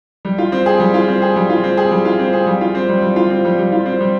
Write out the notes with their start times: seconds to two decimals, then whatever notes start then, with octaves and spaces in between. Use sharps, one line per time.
0.25 G3
0.38 F4
0.52 C4
0.66 G#4
0.80 G3
0.94 F4
1.08 C4
1.22 G#4
1.36 G3
1.50 F4
1.64 C4
1.77 G#4
1.91 G3
2.05 F4
2.19 C4
2.33 G#4
2.47 G3
2.61 F4
2.75 C4
2.89 G3
3.03 G3
3.16 F4
3.30 C4
3.45 G3
3.59 G3
3.72 F4
3.86 C4
4.00 G3